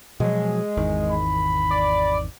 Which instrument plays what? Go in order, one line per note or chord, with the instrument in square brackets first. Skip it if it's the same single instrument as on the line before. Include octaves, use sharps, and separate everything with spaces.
[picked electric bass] B2 F3 F#3 [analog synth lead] G#3
[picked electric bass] G#1 E2 D#3
[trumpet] B5
[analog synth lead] D5